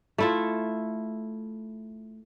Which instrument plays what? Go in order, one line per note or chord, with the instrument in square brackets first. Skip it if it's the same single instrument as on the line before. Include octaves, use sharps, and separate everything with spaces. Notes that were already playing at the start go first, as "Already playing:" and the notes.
[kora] A3 E4 F4